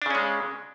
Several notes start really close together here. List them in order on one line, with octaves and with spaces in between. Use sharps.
D4 C#3 C#4 G#3